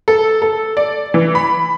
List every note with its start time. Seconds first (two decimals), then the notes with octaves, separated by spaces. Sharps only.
0.08 A4
0.42 A4
0.77 D5
1.14 E3
1.35 B5